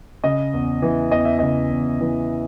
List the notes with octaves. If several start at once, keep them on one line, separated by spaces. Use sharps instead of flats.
C#3 D#5
E2
E3
E2 D#5
E5
C#3 D#5
E2
E3